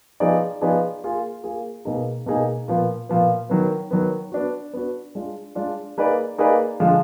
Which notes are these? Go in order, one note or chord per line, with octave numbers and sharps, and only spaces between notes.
F3 B3 D#4 G#4 D5
F3 B3 D#4 G#4 D5
A#3 F4 G#4
A#3 F4 G#4
B2 A#3 D#4 G#4
B2 A#3 D#4 G#4
A#2 F3 B3
A#2 F3 B3
D#3 F#3 B3
D#3 F#3 B3
B3 D4 F#4
B3 D4 F#4
G#3 D4 F4
G#3 D4 F4
A#3 D#4 G#4 B4 D5
A#3 D#4 G#4 B4 D5
D3 F3 G#3